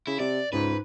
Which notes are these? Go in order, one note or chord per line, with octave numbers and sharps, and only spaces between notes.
C#3 E4
C3 D5
C#2 G#2 B4